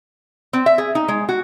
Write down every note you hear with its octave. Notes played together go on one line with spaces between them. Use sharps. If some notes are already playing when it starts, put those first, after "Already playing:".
C4
E5
G#4
D#4
G#3
F#4